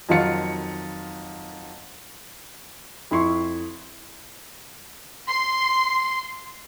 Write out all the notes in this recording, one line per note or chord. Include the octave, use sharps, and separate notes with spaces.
F2 D#3 F#3 F4 C#7
F2 E4 C6 C#6
C6